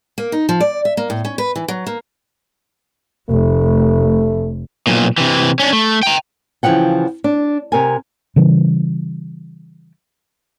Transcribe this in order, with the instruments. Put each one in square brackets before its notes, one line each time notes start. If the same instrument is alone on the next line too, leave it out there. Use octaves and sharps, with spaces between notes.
[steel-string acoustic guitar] A#3
D#4
F3
D5
E5
A#3
A2
C#4
B4
E3
F#3
A#3
[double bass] F1 [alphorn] A3
[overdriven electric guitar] B1 A#2
C3 E3
C#4 D4
A3
G5 A#5
[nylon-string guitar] C#3 E3 F3 F#5 G5
D4
C3 A#4 G#5
[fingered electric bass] C#3 E3 G3